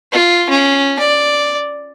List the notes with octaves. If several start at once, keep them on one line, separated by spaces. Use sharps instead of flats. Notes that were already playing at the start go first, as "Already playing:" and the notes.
F4
C#4
D5